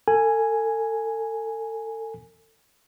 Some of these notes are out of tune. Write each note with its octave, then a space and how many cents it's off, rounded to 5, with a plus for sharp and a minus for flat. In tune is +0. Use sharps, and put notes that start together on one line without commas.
A4 +35 G#5 +0